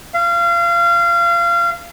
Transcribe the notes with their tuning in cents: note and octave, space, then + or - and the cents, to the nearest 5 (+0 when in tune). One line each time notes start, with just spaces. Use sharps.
F5 -30